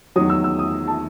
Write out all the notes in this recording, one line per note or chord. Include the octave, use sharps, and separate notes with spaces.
E2 D#3 F#3 D#6
E6
E6
D#6
A5